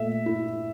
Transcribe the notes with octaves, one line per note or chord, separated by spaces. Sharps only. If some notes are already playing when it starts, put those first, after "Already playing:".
Already playing: A#2 A3 E5
E4